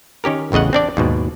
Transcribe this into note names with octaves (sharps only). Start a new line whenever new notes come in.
D#3 C#4 G4 A#4
A1 E2 C#3 D#5 F#5
C4 D4 D5
D#2 G#2 B2